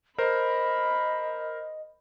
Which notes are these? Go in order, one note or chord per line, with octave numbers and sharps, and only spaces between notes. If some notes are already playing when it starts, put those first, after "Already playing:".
A#4 C5 D#5 B5